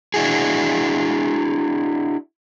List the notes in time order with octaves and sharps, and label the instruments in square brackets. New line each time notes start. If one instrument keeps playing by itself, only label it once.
[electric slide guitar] D4 E4 F#4 G#4